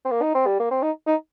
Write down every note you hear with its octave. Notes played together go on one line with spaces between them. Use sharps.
C4
A#3
D#4
C4
G3
A#3
C4
D#4
D#4